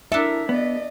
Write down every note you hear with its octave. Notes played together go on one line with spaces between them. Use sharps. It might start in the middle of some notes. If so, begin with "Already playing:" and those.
D4 E4 A4 A#4 E5
B3 D5 D#5